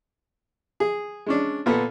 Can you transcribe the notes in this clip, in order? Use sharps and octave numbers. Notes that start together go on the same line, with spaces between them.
G#4
G#3 C#4 D4
A#2 B3 A4